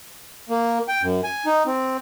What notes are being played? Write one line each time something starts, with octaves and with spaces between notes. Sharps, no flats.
A#3
G5
F#2
G#5
D#4
C4